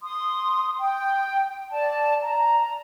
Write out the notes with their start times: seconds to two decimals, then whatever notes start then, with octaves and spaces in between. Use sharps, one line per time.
0.02 C6 D#6
0.79 G5
1.71 D5 A5
2.22 A#5